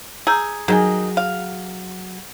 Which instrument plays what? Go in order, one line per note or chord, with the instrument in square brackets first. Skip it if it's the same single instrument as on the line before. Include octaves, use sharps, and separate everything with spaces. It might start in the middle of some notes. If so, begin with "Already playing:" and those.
[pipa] G#4 [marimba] A#5 E6 G6
[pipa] D#3 D#4 [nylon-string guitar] F#3 [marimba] G#4 G#5
[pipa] F5